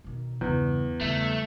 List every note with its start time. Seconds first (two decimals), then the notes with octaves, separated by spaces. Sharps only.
0.04 B2 D#3
0.41 E2 G2 C#3
1.01 C#3 G3 A3